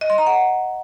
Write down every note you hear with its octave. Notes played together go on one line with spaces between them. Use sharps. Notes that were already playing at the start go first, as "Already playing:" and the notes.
D#5
C6
A#5
F#5